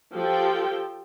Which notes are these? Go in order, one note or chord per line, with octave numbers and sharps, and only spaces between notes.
F3 G4 A4 G5